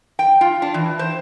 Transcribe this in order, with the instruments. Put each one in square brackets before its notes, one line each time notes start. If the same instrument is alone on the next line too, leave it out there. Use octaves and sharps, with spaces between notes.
[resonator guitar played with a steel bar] G5
F4
D4
E3
C5